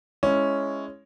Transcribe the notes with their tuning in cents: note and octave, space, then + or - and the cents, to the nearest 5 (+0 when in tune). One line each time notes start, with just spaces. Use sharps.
G#3 +0 C#4 +0 E4 +5